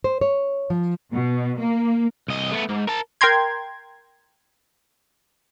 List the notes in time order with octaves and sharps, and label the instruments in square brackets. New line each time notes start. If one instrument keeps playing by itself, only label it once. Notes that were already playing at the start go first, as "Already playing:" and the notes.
[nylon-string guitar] C5
C#5
F3
[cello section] B2
A#3
[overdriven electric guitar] C2 D#5
A3 B3
G#2
A#4 A5
[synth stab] A#4 G5 A#5 C6 G#6